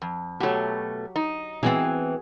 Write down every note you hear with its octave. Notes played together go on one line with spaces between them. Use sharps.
F2
B2 F#3 A3 G4
D#4
E3 B3 C4 F#4 G#4